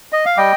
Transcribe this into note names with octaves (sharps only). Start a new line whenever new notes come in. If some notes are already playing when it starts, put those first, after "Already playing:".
D#5
F5
G3 D#5 G5